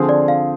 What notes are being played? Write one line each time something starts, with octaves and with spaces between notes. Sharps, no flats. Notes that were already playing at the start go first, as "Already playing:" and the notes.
Already playing: D3 F3 C4 F4 G#4
D5
F5